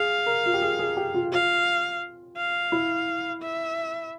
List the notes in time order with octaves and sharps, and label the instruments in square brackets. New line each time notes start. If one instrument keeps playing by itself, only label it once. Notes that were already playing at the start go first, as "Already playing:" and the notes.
Already playing: [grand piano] G#4 [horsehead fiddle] F5
[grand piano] A#4
F4
G4
G#4
G#4
G4
F4
[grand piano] F4 [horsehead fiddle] F5
[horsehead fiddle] F5
[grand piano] E4
[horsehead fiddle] E5